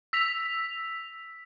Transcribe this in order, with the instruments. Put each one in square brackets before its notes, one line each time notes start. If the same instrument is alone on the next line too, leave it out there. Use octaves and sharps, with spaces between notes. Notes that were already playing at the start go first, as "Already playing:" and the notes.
[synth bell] E6 B6 F7